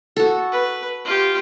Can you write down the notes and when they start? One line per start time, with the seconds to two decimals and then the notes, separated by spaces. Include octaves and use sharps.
0.16 F#4 A4
0.52 B4
1.05 F4 G4